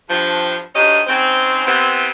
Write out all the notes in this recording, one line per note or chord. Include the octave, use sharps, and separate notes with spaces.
G2 F3
D2 G#2 C#4 G4 D#5
G#2 C#3 C4
C3 E3 B3 C4